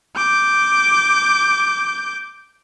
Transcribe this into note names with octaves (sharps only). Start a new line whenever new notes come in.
D6 G6